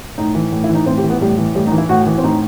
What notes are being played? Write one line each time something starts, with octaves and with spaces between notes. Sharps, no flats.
A2 D#4
E3
A2
E4
E3
D#4
A2 C4
G4
E3
B3
A2 G3
E3
A2 G3
D#4
E3
E4
A2 F#4
E3
C4
A2 D#4